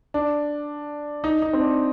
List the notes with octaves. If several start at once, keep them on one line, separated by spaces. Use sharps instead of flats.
D4
D#4
D#4
C4
D4